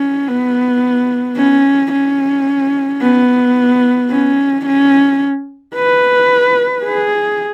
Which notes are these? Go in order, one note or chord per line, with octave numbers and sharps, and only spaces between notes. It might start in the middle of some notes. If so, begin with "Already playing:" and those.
Already playing: C#4
B3
C#4
C#4
B3
C#4
C#4
B4
G#4